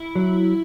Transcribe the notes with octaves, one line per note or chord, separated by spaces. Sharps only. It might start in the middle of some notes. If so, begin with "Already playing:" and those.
Already playing: E4
F#3